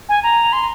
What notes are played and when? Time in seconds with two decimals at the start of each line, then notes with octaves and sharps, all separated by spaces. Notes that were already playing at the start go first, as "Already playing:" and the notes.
0.09 G#5
0.23 A#5
0.53 C6